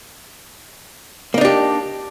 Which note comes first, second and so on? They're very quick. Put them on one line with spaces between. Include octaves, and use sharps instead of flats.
A#3 D#4 D4 G4